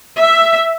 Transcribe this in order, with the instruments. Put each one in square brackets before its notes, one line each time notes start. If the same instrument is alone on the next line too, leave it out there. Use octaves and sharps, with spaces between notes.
[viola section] E5